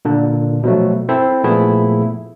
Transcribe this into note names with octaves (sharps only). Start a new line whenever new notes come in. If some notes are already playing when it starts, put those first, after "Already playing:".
A#2 D3 D4
B2 F3 F#3 A3
C4 E4 A4 C5
A#2 F3 A3 B3 E4 G#4